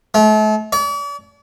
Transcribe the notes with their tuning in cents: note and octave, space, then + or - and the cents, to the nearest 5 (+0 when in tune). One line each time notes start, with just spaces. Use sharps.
A3 -40
D5 -45